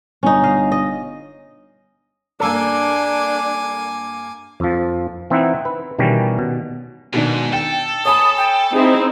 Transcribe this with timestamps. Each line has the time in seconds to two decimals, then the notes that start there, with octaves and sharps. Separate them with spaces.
0.23 G1 C#4 D#4
0.43 D#5 F5
0.72 D#5
2.40 G2 A#3 D4 A4 G#5 D6
4.60 F2 F3
5.30 E3 C4 D#4 E4 F#5
5.65 B4
5.99 B2 D#3 E3 G3 C#4
6.39 B2
7.13 G#2 B2 D#3 D4
7.53 A4 G5
8.05 C#5 G#5 B5 D#6
8.37 G5
8.74 C4 D#4 E4 G#4